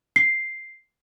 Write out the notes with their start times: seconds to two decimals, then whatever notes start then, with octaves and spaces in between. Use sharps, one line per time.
0.16 C7